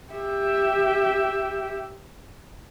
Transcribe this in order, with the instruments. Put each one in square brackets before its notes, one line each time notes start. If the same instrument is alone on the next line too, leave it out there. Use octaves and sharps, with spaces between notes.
[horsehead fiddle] G4 E5